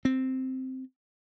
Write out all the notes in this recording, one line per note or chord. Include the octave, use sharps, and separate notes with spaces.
C4